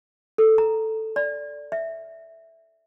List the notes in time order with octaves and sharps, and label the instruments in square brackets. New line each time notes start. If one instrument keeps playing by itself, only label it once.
[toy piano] A4
A#5
D5
E5